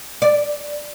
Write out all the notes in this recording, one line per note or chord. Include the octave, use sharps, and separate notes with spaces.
D5